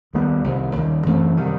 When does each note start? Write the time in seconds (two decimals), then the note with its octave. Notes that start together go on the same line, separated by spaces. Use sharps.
0.13 D#2 D#3 G3 B3
0.44 C2 C3 D#3
0.76 D#2 D#3 G3
1.06 F#2 E3 A3 C4
1.37 C3 D#3 G3